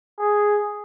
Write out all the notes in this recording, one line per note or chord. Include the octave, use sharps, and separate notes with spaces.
G#4